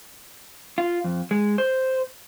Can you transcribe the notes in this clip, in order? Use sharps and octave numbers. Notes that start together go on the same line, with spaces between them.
F4
F2
G#3
C5